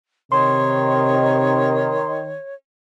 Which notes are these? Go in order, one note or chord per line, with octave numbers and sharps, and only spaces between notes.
C3 D#3 C#5 C6